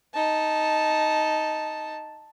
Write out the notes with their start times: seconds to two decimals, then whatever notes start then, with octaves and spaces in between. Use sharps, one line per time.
0.14 D#4 A5